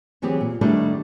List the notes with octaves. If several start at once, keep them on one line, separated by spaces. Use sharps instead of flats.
D2 E3 F#3 C4 G4 G#4
A#2
D#3 G3 A3 B3 D4 E4